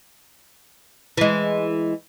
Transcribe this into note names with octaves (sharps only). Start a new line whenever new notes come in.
E3 G#3